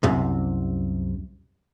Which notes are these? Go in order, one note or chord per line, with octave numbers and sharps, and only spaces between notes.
C2 F#2 C3